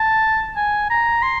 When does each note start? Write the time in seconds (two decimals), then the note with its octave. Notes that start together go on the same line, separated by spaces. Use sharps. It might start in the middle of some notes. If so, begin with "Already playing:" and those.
Already playing: A5
0.57 G#5
0.90 A#5
1.22 C6